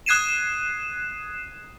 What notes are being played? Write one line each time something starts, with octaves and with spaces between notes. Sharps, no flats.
D#6 F#6 G#6 C7 D#7 E7